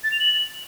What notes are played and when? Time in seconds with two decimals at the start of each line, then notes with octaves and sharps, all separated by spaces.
0.04 A6
0.12 F7
0.20 F#7